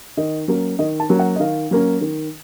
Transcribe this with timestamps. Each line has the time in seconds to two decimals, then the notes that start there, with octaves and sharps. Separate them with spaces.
0.17 D#3 D#5
0.48 F#3 A#3 C#4
0.79 D#3 D#5
1.00 A5
1.09 F#3 A#3 C#4
1.19 F#5
1.36 D#5
1.40 D#3 F5
1.71 F#3 A#3 C#4
2.01 D#3